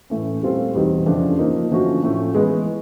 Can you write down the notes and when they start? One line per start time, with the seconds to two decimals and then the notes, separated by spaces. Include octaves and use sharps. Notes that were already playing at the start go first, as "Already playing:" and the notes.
0.10 A2 E3 A3 C#4
0.42 A#2 G3 C4 F4 A4
0.74 E2 B2 G3 C4 D#4
1.06 F2 C#3 F3 A3 D4
1.39 F3 A#3 D#4
1.71 D3 F3 A3 C#4 F#4
2.03 A2 F3 A3 C#4
2.35 E3 G#3 B3